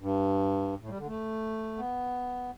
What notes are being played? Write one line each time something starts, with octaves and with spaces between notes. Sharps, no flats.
G2
A2
G3
D3
A3
B3